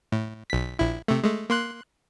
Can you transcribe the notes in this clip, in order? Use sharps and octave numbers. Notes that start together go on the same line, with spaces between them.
A2
B1 B6
A#1 E4
C3 A3
G#3 A3
A#3 C6 F#6